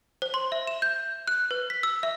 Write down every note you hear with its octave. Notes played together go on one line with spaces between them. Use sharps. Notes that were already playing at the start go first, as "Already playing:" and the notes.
C5
C6
E5
E7
G6
F#6
B4
B6
E6
E5